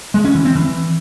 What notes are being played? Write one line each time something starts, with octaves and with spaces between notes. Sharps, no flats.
G#3
C#4
E3
C4
E3